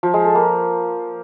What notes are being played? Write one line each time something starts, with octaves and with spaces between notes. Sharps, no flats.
F3
G#3
A4
A#3